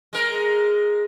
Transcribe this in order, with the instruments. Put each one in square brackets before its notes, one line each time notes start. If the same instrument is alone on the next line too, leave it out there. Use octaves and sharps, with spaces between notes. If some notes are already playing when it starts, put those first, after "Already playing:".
[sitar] G#3 A#4